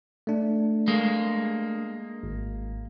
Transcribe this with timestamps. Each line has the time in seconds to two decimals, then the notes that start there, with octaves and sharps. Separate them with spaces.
0.27 A3 D4
0.88 G#3 A#3
2.23 G#1